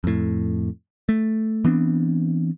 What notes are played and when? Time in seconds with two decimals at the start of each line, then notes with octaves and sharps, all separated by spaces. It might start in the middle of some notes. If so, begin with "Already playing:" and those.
0.04 F2 A2
1.09 A3
1.64 E3 B3 C4 D4